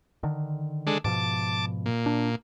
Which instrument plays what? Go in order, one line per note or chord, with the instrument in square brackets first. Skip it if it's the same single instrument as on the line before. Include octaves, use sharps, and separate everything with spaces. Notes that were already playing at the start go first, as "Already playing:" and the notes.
[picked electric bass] D3 D#3
[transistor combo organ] G#3 D4 A4
[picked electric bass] G#2 B2 F3 [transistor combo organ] A5 D6
[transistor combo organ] A#2
[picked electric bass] D4